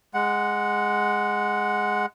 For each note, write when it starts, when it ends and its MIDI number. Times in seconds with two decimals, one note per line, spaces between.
0.14 2.06 56
0.14 2.06 78